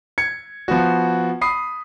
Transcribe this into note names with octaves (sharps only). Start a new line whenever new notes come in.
G#6 C#7
F3 B3 F#4
B5 D#6 C7